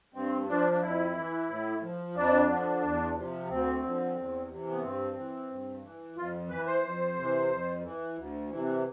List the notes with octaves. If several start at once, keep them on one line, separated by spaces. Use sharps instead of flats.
G2 C4
F3 D4
D4
F2 E4
E3
A2
F3
F2 D4
D3 F3
E2
C3 F3
D2 C4
D3 F3
E2
C3 E3
B3
G2 C4
E3
G2
E3
F2 F4
E3 B4
C5
F2
C3 E3
F2
E3
D2
C3 E3